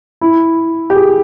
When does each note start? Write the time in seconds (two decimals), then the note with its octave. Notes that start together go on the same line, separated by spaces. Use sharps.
0.21 E4
0.90 G4
0.95 G#4